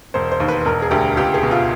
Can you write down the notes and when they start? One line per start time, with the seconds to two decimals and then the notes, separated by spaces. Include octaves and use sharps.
0.14 E1 C5
0.31 C5
0.40 D#2
0.48 B4
0.65 E1 A#4
0.82 G#4
0.91 D2 G4
1.17 C#2 G4
1.34 G#4
1.43 B2
1.51 F4